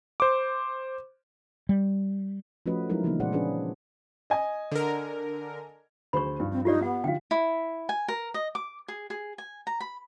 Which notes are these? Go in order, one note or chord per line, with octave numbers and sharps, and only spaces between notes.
C5 D6
G3
F3 A3 C#4 F#4 B4 D#5
F3 F#3 G#3 D#4 E4 A#4
C#3 E3 F3 A#3 B3 D#4
A#2 G#3 G#4 C5 D5 F#5
F3 C#4 D4 F4 G#4 B4
D#5 G#5
D3 A#4
D2 G#4 C5 B5 C#6
G2 F3
C4
D#4 F4 G4 D5
B3 F#5
D3 F3 F5 G5
E4
G#5
A#4
D#5
D6
G#4
G#4
G#5
A#5
B5